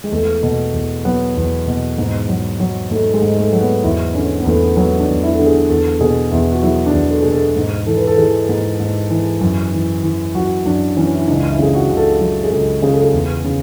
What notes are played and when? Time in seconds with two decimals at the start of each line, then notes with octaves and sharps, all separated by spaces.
0.04 G#3
0.12 E2 A3
0.43 B2
0.73 E2
1.05 F#3 B3
1.36 E2
1.67 B2
1.98 G#2
2.29 F#3
2.60 F#3
2.91 G#2 A3
3.14 G#3
3.22 G#2
3.37 A3
3.53 F#3
3.61 B3
3.83 E2 E4
4.14 D3 C#4
4.40 B3
4.46 E2 A3
4.77 F#3 B3
5.00 D4
5.08 E2
5.23 E4
5.35 D3 A4
5.46 G#4
5.70 E2 A4
6.00 B2 G#4
6.32 E2 E4
6.52 F#4
6.63 F#3 E4
6.86 D4
6.94 E2
7.09 A4
7.22 B2 G#4
7.33 A4
7.56 G#2
7.86 E3 A4
7.97 B4
8.07 A4
8.18 E3 G#4
8.49 G#2
8.80 G#2
9.10 E3
9.41 F#2
9.72 E3
10.04 E3
10.35 F#2 F#4
10.65 F#2 D4
10.96 E3 C#4
11.15 E4
11.28 C#2 D4
11.51 E4
11.58 C#3 G#4
11.75 F#4
11.90 C#2
11.97 A4
12.21 F#3
12.44 G#4
12.51 C#2 A4
12.82 C#3 G#4
12.93 A4
13.03 G#4
13.13 E2
13.45 C#3